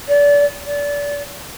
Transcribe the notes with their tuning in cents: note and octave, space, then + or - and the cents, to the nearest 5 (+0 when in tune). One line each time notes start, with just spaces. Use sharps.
D5 -30
D5 -30